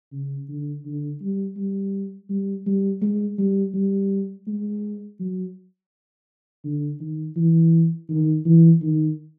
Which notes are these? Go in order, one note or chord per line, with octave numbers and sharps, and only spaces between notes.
C#3
D3
D3
G3
G3
G3
G3
G#3
G3
G3
G#3
F#3
D3
D#3
E3
D#3
E3
D#3